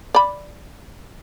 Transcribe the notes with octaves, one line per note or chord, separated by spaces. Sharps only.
D5 B5